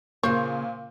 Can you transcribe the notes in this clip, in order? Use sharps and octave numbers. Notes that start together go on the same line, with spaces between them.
A#2 C#3 A#3 F4 A#4 C5 C#5